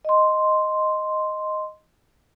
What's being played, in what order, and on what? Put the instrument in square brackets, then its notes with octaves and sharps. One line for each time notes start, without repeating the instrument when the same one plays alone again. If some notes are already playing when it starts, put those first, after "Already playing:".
[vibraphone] D#5 C6